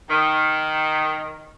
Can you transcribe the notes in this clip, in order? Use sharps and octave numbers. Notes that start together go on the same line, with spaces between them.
D#3